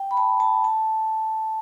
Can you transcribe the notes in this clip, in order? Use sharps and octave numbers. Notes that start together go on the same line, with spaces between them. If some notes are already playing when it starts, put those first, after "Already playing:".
Already playing: G5
B5
A5
A5
A5